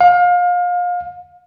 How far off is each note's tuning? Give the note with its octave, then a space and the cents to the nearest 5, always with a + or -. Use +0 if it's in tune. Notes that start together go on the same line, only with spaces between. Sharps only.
F5 +30